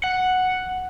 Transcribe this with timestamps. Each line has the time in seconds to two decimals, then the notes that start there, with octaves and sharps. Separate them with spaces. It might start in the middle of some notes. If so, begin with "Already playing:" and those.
0.04 F#5